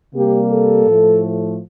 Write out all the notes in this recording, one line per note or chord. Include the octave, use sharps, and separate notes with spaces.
C3 G3 A#3 G4
A4
A2 F3 A3